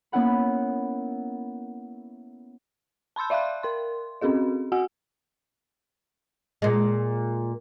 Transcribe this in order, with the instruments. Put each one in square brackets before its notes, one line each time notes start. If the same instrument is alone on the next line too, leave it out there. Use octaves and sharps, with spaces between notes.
[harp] A#3 B3 C#4 E4 F#5 B5
[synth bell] A5 B5 C6 E6 G6
D5 E5 F5 B5 C6 F#6
A#4 C6
C4 C#4 F#4 G#4 D#5
F#4 F#5 G#5 E6
[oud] A#2 G#3